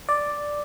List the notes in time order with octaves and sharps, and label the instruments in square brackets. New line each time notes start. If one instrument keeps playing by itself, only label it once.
[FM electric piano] D5